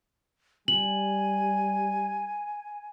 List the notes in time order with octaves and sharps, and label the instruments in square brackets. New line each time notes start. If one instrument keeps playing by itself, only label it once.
[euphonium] G3 [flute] G#5 [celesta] F#7